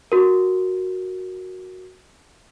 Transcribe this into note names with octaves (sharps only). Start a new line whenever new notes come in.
F#4 A#4